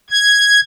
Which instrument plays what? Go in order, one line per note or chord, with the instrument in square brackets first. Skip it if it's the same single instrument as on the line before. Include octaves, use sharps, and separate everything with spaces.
[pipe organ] G#6